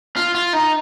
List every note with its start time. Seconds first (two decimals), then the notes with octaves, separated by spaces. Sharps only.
0.16 F4
0.35 F4
0.53 D#4